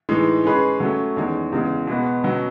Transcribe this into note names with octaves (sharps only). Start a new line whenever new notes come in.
A2 E3 G#3 D#4
G#3 C#4 G#4 B4
F#3 A3 C#4
E2 D#3 G#3 C#4
E2 C#3 G#3
B2 G#3 B3 F#4
B2 F#3 C#4